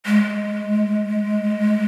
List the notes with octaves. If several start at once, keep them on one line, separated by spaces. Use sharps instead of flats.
G#3